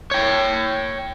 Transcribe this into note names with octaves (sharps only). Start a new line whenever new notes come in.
C#5 G5